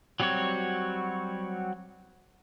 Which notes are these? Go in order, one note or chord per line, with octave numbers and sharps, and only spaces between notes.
F#3 G3 C4 F#4 C#5